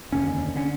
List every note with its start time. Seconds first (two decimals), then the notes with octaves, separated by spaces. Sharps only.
0.12 F1 D#2 D3 C#4
0.56 D3 C#4